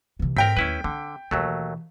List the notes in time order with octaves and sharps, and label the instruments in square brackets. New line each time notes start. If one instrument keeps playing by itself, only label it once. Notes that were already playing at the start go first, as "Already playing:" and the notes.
[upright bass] C3 E3
[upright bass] G#2 [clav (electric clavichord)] C4 A#4 [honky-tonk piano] G5 B6
[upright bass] D#2 A3 [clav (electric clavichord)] C#4 E4 B4
[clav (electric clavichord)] D3 [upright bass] C4
[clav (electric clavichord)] D#2 F#3 A3 [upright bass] B2 E3